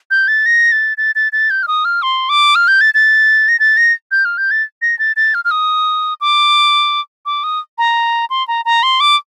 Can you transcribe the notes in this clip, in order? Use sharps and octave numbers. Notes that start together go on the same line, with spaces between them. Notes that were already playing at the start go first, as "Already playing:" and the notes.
G6
A6
A#6
A6
A6
A6
A6
G6
F6
D#6
F6
C6
D6
F6
G6
A6
A6
A#6
A6
A#6
G6
F6
G6
A6
A#6
A6
A6
F6
F6
D#6
D6
D6
D#6
A#5
C6
A#5
A#5
C6
D6